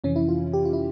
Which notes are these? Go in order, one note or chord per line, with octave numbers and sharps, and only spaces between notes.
F2 C3 E3 C#4
E4
F4
G4
F4
E4